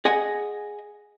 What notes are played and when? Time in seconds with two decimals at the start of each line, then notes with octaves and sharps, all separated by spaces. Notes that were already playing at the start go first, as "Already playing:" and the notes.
0.05 G#4 D#5 F#5 G#5